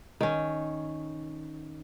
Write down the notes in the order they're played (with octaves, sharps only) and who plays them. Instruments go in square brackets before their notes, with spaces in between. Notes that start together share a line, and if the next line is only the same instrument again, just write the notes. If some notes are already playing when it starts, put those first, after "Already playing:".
[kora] D#3 C#4